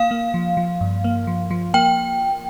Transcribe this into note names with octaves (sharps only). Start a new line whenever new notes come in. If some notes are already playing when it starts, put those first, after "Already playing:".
Already playing: A#3 F5
A#3
F3
F3
G2
A#3
F3
F3
A#3 G5